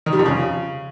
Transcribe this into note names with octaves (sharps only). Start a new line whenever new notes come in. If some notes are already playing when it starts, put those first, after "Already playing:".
D#3
G3
F2
C#3